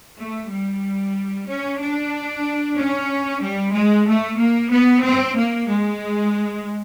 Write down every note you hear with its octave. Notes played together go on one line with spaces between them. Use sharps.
A3
G3
C#4
D4
C#4
G3
G#3
A3
A#3
B3
C4
A#3
G#3